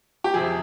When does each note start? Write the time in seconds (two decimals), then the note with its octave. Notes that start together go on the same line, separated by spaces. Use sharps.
0.24 G4
0.34 F2 C3 F3 G#4